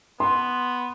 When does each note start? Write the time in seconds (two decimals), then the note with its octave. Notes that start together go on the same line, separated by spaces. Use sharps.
0.20 B3 C6